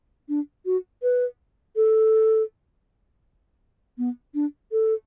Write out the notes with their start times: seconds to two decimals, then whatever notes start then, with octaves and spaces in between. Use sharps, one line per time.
0.29 D4
0.66 F#4
1.03 B4
1.76 A4
3.98 B3
4.34 D4
4.72 A4